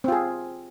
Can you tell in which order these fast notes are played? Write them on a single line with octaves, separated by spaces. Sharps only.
C4 F4 G#4